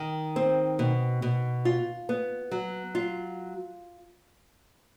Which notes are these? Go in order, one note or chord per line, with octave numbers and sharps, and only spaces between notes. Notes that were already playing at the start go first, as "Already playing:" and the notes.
Already playing: D#3
C4
B2
B2
F4
B3
F#3
F4